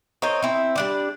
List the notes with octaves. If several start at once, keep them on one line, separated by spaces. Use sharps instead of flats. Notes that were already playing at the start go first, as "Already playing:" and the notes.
C4 A#4 C#5 D#5
C4 E4
G3 D4 D5